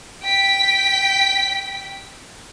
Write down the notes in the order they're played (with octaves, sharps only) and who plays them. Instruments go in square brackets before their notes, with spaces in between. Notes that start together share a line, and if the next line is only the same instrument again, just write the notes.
[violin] G5 B6